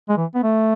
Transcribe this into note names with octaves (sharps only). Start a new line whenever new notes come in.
G#3
E3
B3
A3